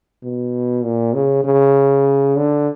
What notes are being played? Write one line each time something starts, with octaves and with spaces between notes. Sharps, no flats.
B2
A#2
C#3
C#3
D3